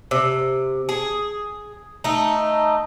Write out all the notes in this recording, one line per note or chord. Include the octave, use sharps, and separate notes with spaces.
C3
G#4
A3 D#4